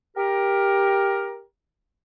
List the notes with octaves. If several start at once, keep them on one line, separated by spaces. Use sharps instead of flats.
G4 A#4